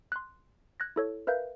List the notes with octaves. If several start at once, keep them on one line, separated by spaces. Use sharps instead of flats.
C6 F#6
F#6 G#6 A#6
E4 A4 C#5
A#4 B4 E5 F5 G6